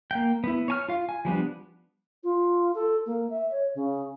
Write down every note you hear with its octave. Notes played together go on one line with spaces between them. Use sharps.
A#3 G5
B3 E4
C#5 G#5 F6
F4 F5
G#5
F3 G3 B3 D4
F4
A4
A#3
E5
C#5
C#3